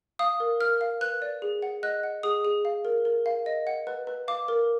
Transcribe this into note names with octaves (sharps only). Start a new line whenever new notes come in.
F5 D#6
A#4
A#4 F6
F5
B4 F#6
D5
G#4
F#5
D#5 F#6
F#5
G#4 D#6
G#4
F5
A#4
A#4
F5
D#5
F#5
B4
B4
F5 D6
A#4